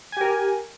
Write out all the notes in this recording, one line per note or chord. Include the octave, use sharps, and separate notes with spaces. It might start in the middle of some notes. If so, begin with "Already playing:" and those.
G4 A#4 G#5